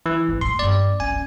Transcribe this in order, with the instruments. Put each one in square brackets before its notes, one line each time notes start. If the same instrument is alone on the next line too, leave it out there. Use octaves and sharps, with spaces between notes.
[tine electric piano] E3
[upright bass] G#1 G#3
[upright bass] A#2 [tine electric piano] C6
[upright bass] G2 A#3 [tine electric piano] D5
[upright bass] C#4 [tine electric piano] G#5
[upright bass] C#4